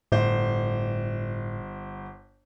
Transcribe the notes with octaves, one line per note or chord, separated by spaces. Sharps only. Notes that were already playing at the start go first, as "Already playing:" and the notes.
G1 A2 C5